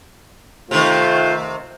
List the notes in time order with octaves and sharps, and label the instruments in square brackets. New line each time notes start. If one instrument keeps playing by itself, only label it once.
[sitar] C3 D#3 [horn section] A3 F4 C5